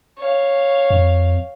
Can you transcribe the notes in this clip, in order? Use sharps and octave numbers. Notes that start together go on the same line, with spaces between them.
C#5 F5
F2